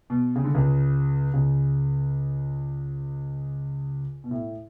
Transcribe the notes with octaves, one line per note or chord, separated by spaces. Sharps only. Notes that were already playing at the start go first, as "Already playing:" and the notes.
B2
C#3
D3
C#2 C#3
C#2 C#3
B2
A2